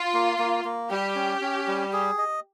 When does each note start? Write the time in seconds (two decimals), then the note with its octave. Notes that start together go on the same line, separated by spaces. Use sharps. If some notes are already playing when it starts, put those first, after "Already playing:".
Already playing: F4
0.14 A#3
0.39 A#3
0.65 A#3
0.90 G3 G4
1.16 C#4
1.41 C#4
1.68 G3
1.93 G#4
2.18 D#5